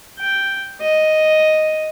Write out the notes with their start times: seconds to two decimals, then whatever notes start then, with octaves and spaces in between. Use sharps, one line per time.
0.19 G5
0.81 D#5